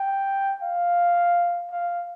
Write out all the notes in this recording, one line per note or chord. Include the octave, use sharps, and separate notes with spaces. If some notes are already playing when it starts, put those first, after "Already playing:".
Already playing: G5
F5
F5